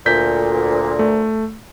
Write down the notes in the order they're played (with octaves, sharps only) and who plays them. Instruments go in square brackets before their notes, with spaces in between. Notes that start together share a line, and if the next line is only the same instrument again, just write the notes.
[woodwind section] D2 A#2 [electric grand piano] G6 B6
[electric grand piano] A3